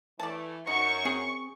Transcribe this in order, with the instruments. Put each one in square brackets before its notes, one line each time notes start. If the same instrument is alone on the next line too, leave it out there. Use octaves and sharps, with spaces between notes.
[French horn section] E3 A3 [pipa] D5 A5
[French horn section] F#2 [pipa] D#4 [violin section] C#6
[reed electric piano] C4 [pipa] G#4